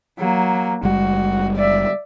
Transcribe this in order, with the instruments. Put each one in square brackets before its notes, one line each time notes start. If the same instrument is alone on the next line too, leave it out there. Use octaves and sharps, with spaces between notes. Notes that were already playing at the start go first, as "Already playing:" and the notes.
[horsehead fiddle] F#3 A#3
[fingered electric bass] F#1 G3 G#3 [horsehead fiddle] F#4
[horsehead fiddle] D5 E5